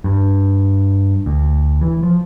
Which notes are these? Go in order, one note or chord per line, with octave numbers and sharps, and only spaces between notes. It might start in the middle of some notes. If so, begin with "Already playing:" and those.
G2
D2
E3
F3